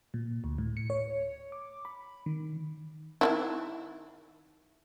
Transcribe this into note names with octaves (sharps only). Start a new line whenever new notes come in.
A#2
D2
A2
C#7
C#5
D6
B5
D#3
D#3 D#4 E4